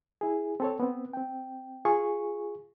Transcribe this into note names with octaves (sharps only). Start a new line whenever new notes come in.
E4 G#4
C4 A4 C#5
B3 C4
C4 G5
F4 G#4 C#6